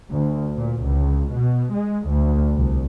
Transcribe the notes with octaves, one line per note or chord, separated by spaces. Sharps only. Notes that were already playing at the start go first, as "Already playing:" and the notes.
D2
A#2
C#2
B2
G#3
D2
C2